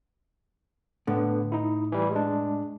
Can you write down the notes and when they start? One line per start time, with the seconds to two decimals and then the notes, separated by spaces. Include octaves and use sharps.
1.07 A2 D3 B3
1.52 D#4 E4
1.92 E3 G3
2.12 G#3 D4